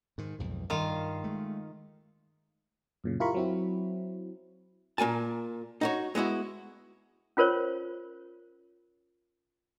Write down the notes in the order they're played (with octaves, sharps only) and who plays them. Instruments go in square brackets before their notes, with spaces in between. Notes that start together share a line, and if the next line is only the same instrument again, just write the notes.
[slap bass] G#2 D#3
B1 F2 G#2
[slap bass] G2 G3 [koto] D#3 F4 F5
[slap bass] G#3 A3
[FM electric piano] F#2 A#2 C#3
E4 F4 G4 A#4 B5 C#6
F#3 C4 E4
[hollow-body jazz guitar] A#2 A#3 G#5 A5
D#4 F#4 C#5
G#3 B3 E4 F#4
[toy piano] C#4 F4 A#4 C5 C#5